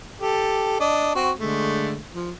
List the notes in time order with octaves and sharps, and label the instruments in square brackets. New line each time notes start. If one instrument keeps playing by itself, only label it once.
[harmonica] G4 A4
D4 D#5
C4 F#4
D3 G#3 A3
F3